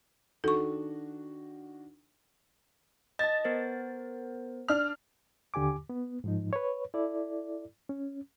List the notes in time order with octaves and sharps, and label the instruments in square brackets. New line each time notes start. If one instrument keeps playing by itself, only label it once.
[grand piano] D#3 D4 F#4 [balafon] A4 C#6
[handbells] D#5 A5 [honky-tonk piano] A6
[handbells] B3 A#4 C5
[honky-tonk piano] D4 F6
[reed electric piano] D#2 D3 G4 G#5 D6
B3
G#2 F3 D#4
B4 C#5
E4 A4 D5
C#4